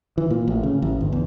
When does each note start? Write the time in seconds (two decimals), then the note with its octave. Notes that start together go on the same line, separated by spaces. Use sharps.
0.18 E3
0.30 A#2
0.48 A1
0.63 C#3
0.82 A1
1.01 G1
1.12 E2